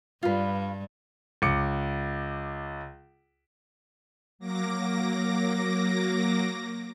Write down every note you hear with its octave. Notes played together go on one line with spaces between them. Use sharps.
G2 G3 F4 B4
C#2 D6 C#7
F#3 A#3 D6 A#6